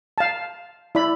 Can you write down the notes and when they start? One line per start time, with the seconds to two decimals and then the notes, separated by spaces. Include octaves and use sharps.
0.18 F5 A5
0.95 E4 D5 B5